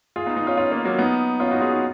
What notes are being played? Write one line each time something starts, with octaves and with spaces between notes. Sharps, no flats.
F4 G#4
B3 D#4
B3 D#4
C#4 F4
C#4 F4
A#3 C#4
F#3 A#3
B3 D#4
C#4 F4
D#4 F#4
F4 G#4
D#4 F#4